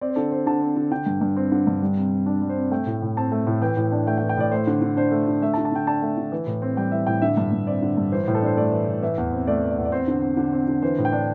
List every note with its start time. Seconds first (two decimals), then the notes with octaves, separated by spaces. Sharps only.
0.01 C4 D5
0.10 C5
0.16 D3 A4
0.31 C4 C5
0.46 D3 A5
0.61 C4
0.76 D3
0.91 D3 G5
1.06 G2
1.21 G2
1.37 C4
1.52 D3
1.67 G2
1.82 G3
1.97 C3
2.12 C3
2.26 D4 D5
2.42 G3
2.49 C5
2.56 C3
2.71 A3 G5
2.87 A2
3.02 A2
3.17 C4 A5
3.32 A3
3.47 A2
3.62 E3 G5
3.77 A2
3.92 D4
4.07 A3 G5
4.18 G5
4.22 E3
4.29 G5
4.37 A2 D5
4.51 A3 C5
4.67 D3
4.82 D3
4.97 D4 C5
5.11 A3
5.27 D3
5.42 A3 E5
5.54 A5
5.58 D3
5.65 A5
5.72 D3 G5
5.87 D4 A5
6.02 A3
6.17 D3
6.32 E3
6.47 A2
6.62 C4
6.77 G3 G5
6.92 E3 E5
7.07 A2 G5
7.22 D3 E5
7.37 G2
7.52 G2
7.67 C4 D5
7.82 D3
7.97 G2
8.12 E3 C5
8.24 C5
8.28 A2
8.35 A4
8.42 D4 C5
8.57 A3 D5
8.72 E3
8.87 A2
9.03 E3 E5
9.18 E2
9.32 C4
9.47 A3 D5
9.62 E3
9.70 D5
9.78 E2
9.85 D5
9.92 C4 C5
10.08 D3
10.22 C4
10.37 D3
10.52 C4
10.68 D3
10.82 E3 C5
10.98 A2
11.05 G5
11.12 D4